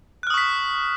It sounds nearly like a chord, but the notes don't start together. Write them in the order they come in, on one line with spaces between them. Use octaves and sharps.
F#6 F6 D#6 C#6 B6